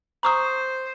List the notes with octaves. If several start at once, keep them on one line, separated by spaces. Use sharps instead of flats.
C5 A#5 C#6 D#6